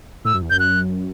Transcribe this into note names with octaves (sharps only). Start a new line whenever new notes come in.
A2 E6
F#2
E2
F#2 G6
F#6